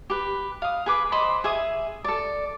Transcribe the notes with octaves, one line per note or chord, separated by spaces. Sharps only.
G4 B4
F5 D#6
G#4 B4 D6
C5 D#5 B5 D6
G#4 E5 D#6
A4 D5